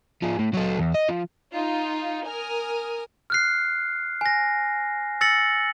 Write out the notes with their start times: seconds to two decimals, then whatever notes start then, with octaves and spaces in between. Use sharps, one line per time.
0.22 F3 G#4
0.39 A2
0.53 F#3 A4
0.78 E2
0.95 D#5
1.09 F3
1.53 D#4 F4
2.28 A#4 G#5 D#6 F6
3.30 F6 F#6 C7
4.21 G#5 A#6
5.21 E6 A6 A#6 C#7 F#7